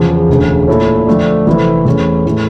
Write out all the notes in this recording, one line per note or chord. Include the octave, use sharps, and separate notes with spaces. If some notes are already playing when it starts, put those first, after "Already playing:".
Already playing: E2 C#3 F3
E1 D2 C#3
A#2 A3 E4 A4 C#5
F2 D3 A3 D4
F1 F2 E3 A3 E4
E2 E3 A3 C#4
A2 E3 A3 E4